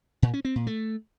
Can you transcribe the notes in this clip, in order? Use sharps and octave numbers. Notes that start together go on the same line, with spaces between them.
A#2
C#4
C4
A#2
A3